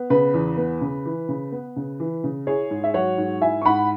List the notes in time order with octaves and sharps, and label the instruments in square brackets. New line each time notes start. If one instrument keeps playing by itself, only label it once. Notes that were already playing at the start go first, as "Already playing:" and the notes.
Already playing: [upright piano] B3
C#3 B4
E2
B3
C#3
E3
C#3
B3
C#3
E3
C#3
E4 G#4 C#5
G#2
E5
F#3 C#5 F#5
G#2
E4 E5 G#5
C#6
G#2 F#5 B5